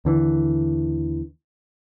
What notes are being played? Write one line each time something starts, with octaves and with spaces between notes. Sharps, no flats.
D#2 D3 E3